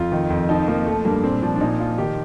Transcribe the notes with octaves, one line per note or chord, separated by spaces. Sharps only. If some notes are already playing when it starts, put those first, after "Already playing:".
Already playing: F2 F4
D#3
F2
F3 D#4
F3 A#3
F3 A3
G2 A#3
A#2 C4
F3 D4
D4
A#2 D#4
F3 F4
D#3 G4